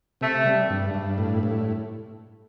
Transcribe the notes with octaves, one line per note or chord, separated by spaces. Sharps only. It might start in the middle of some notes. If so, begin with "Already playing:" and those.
C3 A3
G3
G2
G2
A2
A2